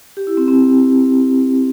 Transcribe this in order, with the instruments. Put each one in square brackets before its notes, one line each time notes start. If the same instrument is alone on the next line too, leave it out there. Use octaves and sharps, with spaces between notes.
[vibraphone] G4
E4
C4
C4